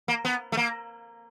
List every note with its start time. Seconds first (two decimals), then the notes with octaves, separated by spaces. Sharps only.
0.08 A#3
0.25 B3
0.52 A3
0.57 A#3